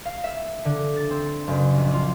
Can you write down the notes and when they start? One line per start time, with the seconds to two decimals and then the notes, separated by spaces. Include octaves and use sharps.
0.05 F5
0.24 E5
0.65 D3
0.96 A6
1.10 C4
1.48 F#1
1.78 A#1
1.94 F4